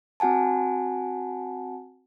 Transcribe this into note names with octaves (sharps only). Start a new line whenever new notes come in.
C4 F#4 F#5 G#5 A5